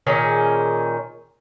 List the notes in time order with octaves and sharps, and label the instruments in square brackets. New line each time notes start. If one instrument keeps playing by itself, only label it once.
[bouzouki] A#2 D#3 C#4 G#4